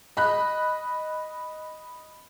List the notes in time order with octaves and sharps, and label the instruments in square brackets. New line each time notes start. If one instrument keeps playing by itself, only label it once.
[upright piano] D#5 B5 F#6